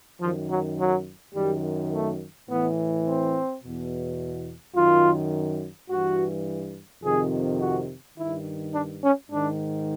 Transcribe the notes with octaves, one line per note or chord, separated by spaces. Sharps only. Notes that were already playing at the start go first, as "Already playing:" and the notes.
F#2 D#3 F3
F#3
F#3
F#2 D#3 G3
A3
A2 E3 B3
C4
E2 B2
F#2 D#3 F4
G2 E3 F#4
F2 C3 D#3 G#4
F#4
G2 D#3 E4
D4
C#4
G#2 D#3 D4